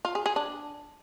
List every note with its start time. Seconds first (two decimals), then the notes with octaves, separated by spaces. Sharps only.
0.05 F4
0.15 G#4
0.26 G#4
0.36 D4